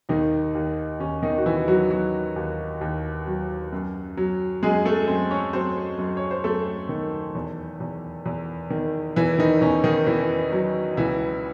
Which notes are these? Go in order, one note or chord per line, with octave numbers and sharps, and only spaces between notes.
D#2 D#3 D#4
D#2
D#2 C#4
D#3 D#4
F#4
D#2 E3 E4
F#3 F#4
F#3 F#4
D#2
D#2
F#3
F#2
F#3
F#2 G#3 G#4
A3 A4
F#2 C4 C5
C#4 C#5
F#3 C4 C5
F#2
C#5
C5
F#2 A3 A4
D#3
E2
E2
E2
D#3
E2 E3 E4
D#3 D#4
E2 C#4
D#3 D#4
E2 E3 E4
F#3
C#2 E3 E4